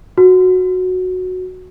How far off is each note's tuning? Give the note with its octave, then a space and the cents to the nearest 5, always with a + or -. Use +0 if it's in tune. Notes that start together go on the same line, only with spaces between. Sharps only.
F#4 -10